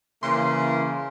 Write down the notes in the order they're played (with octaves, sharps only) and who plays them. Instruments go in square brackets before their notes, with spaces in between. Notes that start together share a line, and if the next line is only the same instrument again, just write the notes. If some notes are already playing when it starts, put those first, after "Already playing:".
[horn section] C#3 E3 A#3 [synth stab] C6